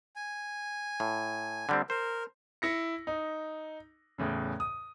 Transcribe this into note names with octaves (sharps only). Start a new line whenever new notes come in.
G#5
A2
D3 G3 C4
A#4 C5
E4 A#6 C#7
D#4
E2 A2 C#3
D#6